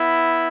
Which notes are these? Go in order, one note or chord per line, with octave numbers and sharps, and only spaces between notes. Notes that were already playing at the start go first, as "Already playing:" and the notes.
Already playing: B3 E4